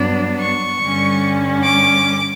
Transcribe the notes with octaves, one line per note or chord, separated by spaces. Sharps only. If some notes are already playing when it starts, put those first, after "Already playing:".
Already playing: G2 F#3 B3 D4
C#6
G2 D3 G3 C#4
D6